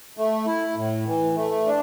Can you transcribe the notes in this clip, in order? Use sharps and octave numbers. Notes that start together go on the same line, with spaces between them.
A3
E4
A2
E3
A3
D4